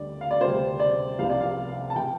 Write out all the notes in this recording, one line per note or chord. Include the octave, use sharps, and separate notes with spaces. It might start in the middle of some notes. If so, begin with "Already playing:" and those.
Already playing: D2 D3 G3 D5
F5
D5
D2 C3 G3 C5
D5
C2 C3 F3 F5
D5
F5
A5
C3 F3 G5